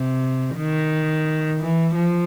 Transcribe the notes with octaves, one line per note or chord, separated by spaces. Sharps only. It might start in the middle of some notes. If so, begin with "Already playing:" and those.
Already playing: C3
D#3
E3
F3